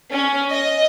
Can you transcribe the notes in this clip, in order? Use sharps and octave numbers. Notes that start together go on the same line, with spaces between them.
C#4
D#5